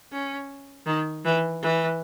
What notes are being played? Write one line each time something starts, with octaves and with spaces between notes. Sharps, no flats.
C#4
D#3
E3
E3